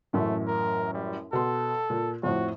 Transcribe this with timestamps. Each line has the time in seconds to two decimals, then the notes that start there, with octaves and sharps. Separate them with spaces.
0.13 A1 F#2 A2 A3
0.47 A#4
0.94 G3
1.33 B2 A4 C6
1.90 A#2
2.23 F2 A2 F#4 C5